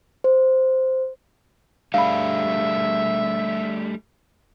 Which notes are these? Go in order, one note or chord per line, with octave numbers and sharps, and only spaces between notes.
C5
G3 A3 D4 E5 F5 B5